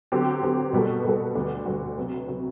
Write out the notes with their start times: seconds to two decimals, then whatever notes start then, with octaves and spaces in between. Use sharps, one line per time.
0.12 D3 F#3 C4 G4
0.42 D3 F#3 C4 G4
0.73 B2 G3 B3 F#4 A4
1.04 B2 G3 B3 F#4 A4
1.35 D2 D3 G3 D4 F#4
1.65 D2 D3 G3 D4 F#4
1.97 C3 F#3 B3
2.28 C3 F#3 B3